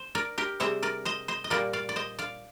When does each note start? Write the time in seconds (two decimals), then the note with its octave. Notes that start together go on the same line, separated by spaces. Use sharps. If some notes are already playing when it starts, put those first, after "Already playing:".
Already playing: C5
0.15 A#4 D5
0.38 G4 A#4
0.60 C3 G3 C4 G#4 C5
0.83 A#4 D5
1.05 C5 D#5
1.28 C5 D#5
1.44 D#5
1.50 A#2 G3 A#3 A#4 D5
1.73 D5 F5
1.89 D5
1.96 C5 D#5
2.19 D5 F5